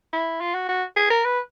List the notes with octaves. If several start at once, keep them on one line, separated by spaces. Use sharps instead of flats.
E4
F4
F#4
F#4
G#4
A#4
B4